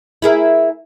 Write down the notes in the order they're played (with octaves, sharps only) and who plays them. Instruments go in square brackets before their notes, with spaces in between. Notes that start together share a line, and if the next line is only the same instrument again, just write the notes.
[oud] E4 G#4 A#4